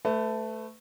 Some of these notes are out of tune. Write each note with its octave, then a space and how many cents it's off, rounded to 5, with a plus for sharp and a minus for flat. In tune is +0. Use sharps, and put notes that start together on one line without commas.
A3 +0 B4 +30